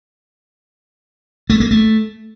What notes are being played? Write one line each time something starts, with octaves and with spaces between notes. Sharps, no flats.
A3
A#3
A3